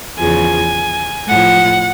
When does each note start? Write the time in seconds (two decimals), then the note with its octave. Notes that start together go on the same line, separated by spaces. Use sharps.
0.16 E2 C#3 F3 G#5
1.28 A2 F3 F#5